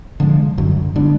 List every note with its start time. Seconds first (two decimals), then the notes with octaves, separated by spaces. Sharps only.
0.20 D3 F3 G#3
0.58 F#2 D3 F#3
0.96 D3 G#3 B3 D4